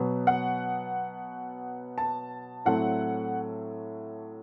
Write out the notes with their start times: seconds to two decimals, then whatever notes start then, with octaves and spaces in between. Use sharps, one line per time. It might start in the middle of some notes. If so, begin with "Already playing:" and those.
Already playing: B2 F#3 B3
0.27 F#5
1.98 A5
2.65 A2 F#3 A3 C4 F#5